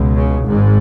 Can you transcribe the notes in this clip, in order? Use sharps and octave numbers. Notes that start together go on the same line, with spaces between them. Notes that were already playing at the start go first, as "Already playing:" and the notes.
Already playing: C#2 B2
C#3
G#1 G#2